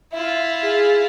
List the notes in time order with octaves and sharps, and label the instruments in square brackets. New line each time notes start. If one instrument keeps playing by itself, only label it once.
[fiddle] E4 F4 [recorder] E5
[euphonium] G#4